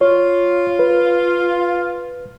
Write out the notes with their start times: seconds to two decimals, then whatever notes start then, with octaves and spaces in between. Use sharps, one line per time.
0.01 F4 C#5
0.79 B4